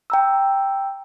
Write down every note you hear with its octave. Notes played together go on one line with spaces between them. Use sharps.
G5 A#5 E6